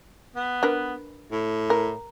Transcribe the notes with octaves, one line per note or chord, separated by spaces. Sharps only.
B3
D4 A#4 B4
A2
A#4